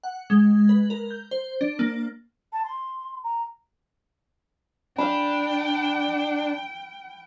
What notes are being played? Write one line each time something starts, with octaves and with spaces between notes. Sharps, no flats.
F#5
G#3
B4
A#4
G6
C5
D4
A#3
A5
C6
A#5
D4 F5 G5 B5